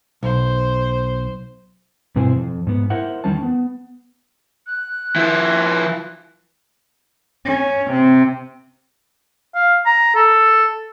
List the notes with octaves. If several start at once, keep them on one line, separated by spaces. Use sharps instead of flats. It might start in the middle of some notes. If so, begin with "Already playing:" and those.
B1 C5
G2 B2 C4 E4 C5 G#5
F2
G#2 B3
E4 A#4 C5 E5 F#5
E2 D#3 G3 C#4 C5 A5
B3
F#6
F3 E4
C#4
C3
F5
A#5
A4